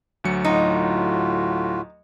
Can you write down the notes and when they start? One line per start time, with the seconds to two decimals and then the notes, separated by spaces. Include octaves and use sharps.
0.24 D2 F#3 C#7
0.45 A2 D#4 F4 F#4